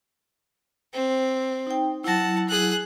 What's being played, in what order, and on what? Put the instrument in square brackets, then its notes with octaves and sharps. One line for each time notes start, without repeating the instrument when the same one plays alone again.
[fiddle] C4
[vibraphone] D#4 G5
[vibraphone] F#3 E4 [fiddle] F#5 A5
[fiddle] G#4 F#6